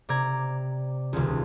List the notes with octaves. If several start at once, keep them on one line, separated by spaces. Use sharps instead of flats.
C3 D5 A#5 G#6
D#1 C#2